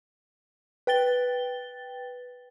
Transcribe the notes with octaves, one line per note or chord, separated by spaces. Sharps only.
B4 G5 A6 G7